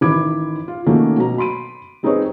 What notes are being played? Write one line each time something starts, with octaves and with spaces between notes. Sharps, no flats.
A1 D#3 B5 D6 G#6 D7
F4
D#3 A3 A#3 C#4 F#4
B2 F#3 A#5
B5 C6 D7 D#7
G3 C4 D#4 G#4 B4 C#5